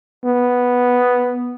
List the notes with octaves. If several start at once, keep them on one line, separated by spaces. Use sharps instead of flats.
B3